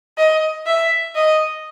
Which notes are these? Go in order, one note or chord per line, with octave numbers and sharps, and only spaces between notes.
D#5
E5
D#5